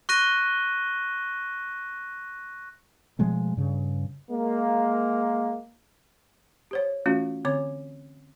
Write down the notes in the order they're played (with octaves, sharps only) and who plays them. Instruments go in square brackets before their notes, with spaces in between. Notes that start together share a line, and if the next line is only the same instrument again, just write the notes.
[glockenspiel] C#6 F#6 A#6 D#7 G7
[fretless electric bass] B2 F3 G#3 A3
G2 C#3
[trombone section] G#3 A#3
[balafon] G4 C5 C#5
E3 A3 C#4 F4 F#4
D3 C4 C#5 D6